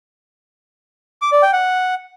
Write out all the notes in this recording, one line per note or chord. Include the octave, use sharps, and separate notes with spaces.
D6
D5
G5
F#5